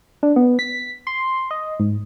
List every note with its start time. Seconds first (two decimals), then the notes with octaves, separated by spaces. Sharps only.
0.23 D4
0.36 B3
0.59 B6
1.07 C6
1.51 D#5
1.80 G#2